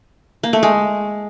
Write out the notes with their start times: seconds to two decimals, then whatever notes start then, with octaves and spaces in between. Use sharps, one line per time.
0.43 A#3
0.53 A3
0.63 G#3